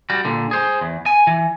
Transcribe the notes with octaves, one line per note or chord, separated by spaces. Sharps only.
G3 F#4
A#2 D3
G#4 C5
E2
G#5
E3